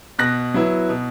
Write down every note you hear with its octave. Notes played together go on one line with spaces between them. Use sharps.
B2 F#6 A#6
F#3 B3 E4
B2